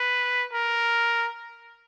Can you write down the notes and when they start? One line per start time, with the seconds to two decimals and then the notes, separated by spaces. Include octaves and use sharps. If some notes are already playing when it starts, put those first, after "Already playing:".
Already playing: B4
0.53 A#4